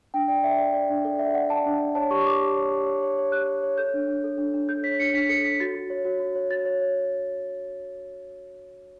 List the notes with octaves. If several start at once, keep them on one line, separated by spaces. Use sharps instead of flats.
D4 G5
D5 G5
D5 E5
D5
D5
D4
A4 D5
D5 E5
D5 F#5
D5 A5
D4
D5
C#5 A5
G4 C#6
G4 D6
G4
C#5
G4
C#5
C#5
C#5
G4 F#6
C#5
C#5
A4 G6
D4
D4
A4
D4
D4
A4 G6
C#5 B6
D4 C#7
D4 B6
A4 C#7
A4 B6
F#4 A6
F#4
C#5
F#4
F#4
C#5
F#4 A6
C#5
C#5